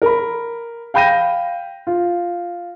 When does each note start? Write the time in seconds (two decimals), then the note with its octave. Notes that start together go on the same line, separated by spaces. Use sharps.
0.02 A#4 B5
0.94 F5 G5 B5 G6 A#6 D#7
1.87 F4